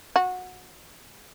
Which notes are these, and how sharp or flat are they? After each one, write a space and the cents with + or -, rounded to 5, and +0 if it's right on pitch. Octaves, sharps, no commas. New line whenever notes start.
F#4 -20